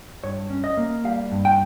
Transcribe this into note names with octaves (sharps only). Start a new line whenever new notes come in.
G2 C#5
C#4
D#5
A#3
G3 F5
G2
G5